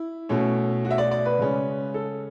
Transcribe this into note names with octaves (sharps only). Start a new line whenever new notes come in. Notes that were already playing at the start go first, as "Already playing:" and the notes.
Already playing: E4
B2 A3 C#4
F#4
E5
D5
D5
B4
C#3 G#3 C#4
A4